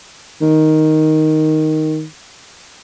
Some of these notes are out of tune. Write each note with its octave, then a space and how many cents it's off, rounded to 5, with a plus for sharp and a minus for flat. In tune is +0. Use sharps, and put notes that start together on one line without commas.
D#3 +5